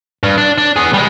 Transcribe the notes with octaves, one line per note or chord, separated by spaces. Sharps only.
G2
D4
D4
B3 G#4
G3 G#3